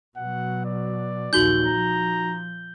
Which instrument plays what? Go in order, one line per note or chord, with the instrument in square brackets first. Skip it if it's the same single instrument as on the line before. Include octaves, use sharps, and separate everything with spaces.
[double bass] B2 F#3 [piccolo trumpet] F#5
[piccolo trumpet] D5
[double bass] A#1 D#2 [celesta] D#4 F#4 F#7 [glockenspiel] G6 G7
[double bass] F3 [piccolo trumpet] A#5